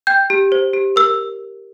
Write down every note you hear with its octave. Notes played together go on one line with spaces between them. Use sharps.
G5 G6
G4
C5
G4
A#4 E6